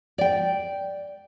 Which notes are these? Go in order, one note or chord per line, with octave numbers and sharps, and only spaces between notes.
D5 G5